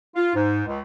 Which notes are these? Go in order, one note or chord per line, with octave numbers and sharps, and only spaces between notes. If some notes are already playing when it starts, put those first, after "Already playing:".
F4
G#2
C#2